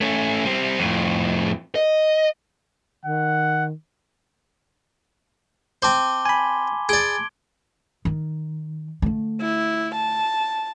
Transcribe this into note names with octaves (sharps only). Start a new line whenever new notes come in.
A3 C#4
G3 C4
F2 A2
D#5
D#3 F#5
C4 C5 A5 D6 G7
G#5 B5 C6
G#4 D5 G#6 D7 G7
D#3
D3 A3
E4
A5